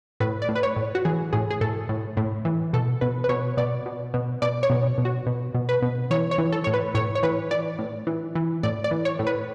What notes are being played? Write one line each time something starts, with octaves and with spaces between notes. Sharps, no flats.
A2 B4
D5
A2
B4
C#5
A2
F#4
E3 G#4
A2 G#4
G#4
A2 A4
A2
A2
E3
B2 A4
B2 B4
B4
B2 C#5
B2 D5
B2
B2
B2 D5
C#5
B2
B2
F#4
B2
B2
B4
B2
E3 C#5
C#5
E3
A4
A2 C#5
B4
A2 C#5
C#5
E3 B4
E3 D5
A2
E3
E3
A2 D5
D5
E3
C#5
A2
B4